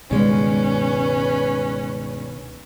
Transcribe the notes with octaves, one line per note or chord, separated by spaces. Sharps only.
C#2 G2 B2 D#3 G#3 C#4 B4